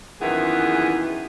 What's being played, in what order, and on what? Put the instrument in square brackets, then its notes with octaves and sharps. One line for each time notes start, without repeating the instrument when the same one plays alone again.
[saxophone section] F#2 A#2 D#3 E3 B3 G#4